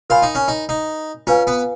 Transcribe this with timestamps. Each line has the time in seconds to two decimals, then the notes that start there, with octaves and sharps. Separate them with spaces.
0.10 F4 A#4 C#5 G#5 B5
0.22 D#4
0.35 C#4
0.48 D#4
0.69 D#4
1.27 C#4 F4 B4 F5 G#5
1.47 B3